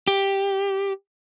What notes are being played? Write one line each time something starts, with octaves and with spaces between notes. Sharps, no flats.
G4